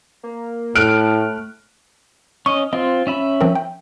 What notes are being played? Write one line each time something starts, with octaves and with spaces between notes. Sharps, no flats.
A#3
A2 A3 F6 F#6 D7
C#4 D#5 C#6
C4 F4 D#5
C#4 E5 B5
F3 C4 A#4
G5